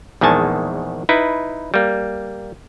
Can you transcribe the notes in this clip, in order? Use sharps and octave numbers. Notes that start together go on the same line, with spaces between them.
A#1 E2 D#3 G#3 G#5 A5
D#4 E4 B4
G3 A#3